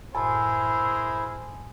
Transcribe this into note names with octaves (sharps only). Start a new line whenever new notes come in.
F#2 A2 E4 G#4 A#4 C5 G#5 A5